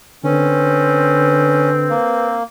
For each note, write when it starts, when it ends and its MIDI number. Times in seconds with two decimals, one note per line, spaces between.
0.24 1.94 50
0.24 2.38 60
0.24 1.70 61
0.24 2.27 71
1.90 2.43 58